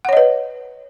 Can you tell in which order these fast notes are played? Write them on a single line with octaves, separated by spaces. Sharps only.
F#5 C#5 D#5 B4